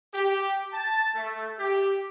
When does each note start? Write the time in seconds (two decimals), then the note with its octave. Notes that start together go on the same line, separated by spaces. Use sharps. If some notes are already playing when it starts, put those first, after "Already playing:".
0.14 G4
0.74 A5
1.15 A3
1.59 G4